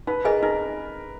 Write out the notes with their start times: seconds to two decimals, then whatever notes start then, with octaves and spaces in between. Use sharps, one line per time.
0.07 D#4 B4
0.24 G#4 A#4 D#5 G#5 B5
0.42 D#4 A#4